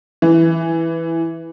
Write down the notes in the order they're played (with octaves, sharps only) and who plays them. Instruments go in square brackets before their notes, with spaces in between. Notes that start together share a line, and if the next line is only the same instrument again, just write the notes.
[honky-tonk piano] E3